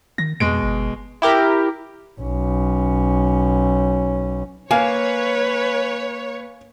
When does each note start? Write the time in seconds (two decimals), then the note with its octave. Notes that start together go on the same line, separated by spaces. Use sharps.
0.18 D#3 A#6
0.40 F2 B2 G#3 D7
0.63 G1
1.22 E4 G4 A#4
2.20 B1 C#4
4.71 A#3 B4 C#5 F5 G#5